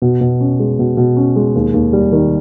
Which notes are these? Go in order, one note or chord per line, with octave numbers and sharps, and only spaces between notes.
B2
B2
C#4
G#3
B2
B2
C#4
G#3
D#2
D#2
G3
D#3